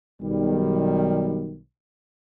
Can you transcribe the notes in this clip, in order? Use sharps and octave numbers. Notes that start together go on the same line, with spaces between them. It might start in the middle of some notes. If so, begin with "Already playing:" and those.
B1 D#3 G3